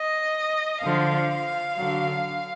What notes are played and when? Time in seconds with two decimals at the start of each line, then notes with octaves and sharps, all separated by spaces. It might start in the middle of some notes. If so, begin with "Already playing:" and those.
Already playing: D#5
0.83 D3 F3 F5
1.75 D3 F#3